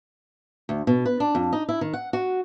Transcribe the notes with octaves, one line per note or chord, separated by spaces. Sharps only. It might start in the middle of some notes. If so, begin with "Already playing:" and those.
D2
B2
B4
D4
F2
D#4
E4
D#3
F#5
F#4